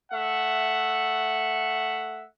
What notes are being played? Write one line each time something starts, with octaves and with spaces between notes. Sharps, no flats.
A3 E5 F#5